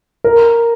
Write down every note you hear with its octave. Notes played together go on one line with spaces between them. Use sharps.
A#4